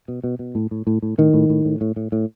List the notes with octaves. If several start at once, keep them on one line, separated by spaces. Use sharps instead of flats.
B2
B2
B2
A2
A2
A2
A2
A2 D#3
A2
A2
A2
A2
A2
A2